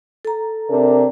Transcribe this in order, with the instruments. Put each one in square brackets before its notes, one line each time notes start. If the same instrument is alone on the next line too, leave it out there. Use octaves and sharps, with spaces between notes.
[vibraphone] A4 A#5
[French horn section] C3 D4 A#4